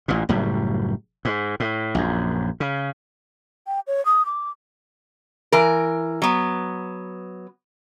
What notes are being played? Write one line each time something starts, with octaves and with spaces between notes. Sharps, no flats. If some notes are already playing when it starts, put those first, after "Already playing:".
A1 A#2
F#1 A2 F#3 G3
G#2
A2
A#1 F#2
C#3
G5
C#5
D#6
D6
E3 A#4
F#3 B3